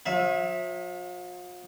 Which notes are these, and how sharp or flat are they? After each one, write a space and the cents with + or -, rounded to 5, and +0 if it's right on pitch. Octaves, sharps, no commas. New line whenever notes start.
F3 +45 E5 +0